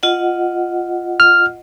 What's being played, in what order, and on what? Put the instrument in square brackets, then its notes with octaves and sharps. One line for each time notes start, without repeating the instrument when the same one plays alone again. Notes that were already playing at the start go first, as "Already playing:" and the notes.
[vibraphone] F4 D#5 F#5
[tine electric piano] F6